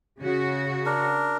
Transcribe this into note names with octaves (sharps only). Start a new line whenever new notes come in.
C#3 F#4
D4 A#4